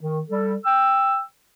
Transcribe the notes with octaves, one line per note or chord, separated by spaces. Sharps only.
D#3
G3 A4
G5 E6